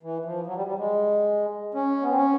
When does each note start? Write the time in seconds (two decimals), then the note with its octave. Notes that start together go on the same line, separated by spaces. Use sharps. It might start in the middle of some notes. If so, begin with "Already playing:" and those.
0.03 E3
0.25 F3
0.46 F#3
0.56 G3
0.67 G3
0.78 G#3
1.74 C#4
2.02 B3
2.09 C4
2.16 C#4